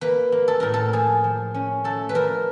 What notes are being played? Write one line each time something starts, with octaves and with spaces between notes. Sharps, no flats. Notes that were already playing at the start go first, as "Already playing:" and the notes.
A#3 B4
A#3
A4
A2 A#4
A4
F3 G#4
F3
C#4
A3 A4
B4
F3 A#4